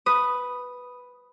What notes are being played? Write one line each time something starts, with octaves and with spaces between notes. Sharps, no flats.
B4 D#6